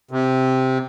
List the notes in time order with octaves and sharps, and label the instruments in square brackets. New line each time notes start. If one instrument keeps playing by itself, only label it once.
[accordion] C3